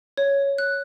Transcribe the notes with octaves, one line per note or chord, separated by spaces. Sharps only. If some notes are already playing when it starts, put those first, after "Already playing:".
C#5
F#6